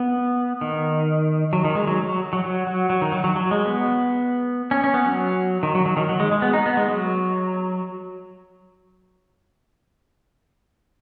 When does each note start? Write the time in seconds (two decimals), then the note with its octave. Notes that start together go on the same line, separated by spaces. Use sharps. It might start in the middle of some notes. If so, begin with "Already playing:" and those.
Already playing: B3
0.61 D#3
1.53 F#3
1.65 D#3
1.75 G#3
1.87 F#3
2.09 F#3
2.33 F#3
2.44 F#3
2.67 F#3
2.90 F#3
3.02 D#3
3.12 F#3
3.24 F#3
3.36 F#3
3.51 G#3
3.66 B3
4.71 C#4
4.84 C#4
4.94 B3
5.06 F#3
5.63 D#3
5.75 F#3
5.86 F#3
5.97 D#3
6.09 F#3
6.20 G#3
6.31 G#3
6.42 B3
6.53 D#4
6.66 B3
6.77 G#3
6.88 F#3